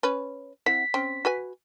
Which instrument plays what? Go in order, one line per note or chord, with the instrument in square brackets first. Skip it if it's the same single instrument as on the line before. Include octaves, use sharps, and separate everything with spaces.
[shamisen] C#4 B4
[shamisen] C4 E4 F#5 [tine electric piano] B6
[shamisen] C4 C#4
F#4 B4 G#5